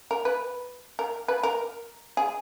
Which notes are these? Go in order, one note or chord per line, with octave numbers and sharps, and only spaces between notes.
A#4
B4
A#4
B4
A#4
G#4